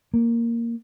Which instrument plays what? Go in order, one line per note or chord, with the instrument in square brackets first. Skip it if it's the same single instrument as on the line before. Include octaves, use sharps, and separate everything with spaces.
[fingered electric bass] A#3